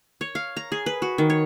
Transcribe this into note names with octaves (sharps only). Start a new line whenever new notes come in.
C#5
F5
A#5
G#4
B4
F#4
D#3
C#5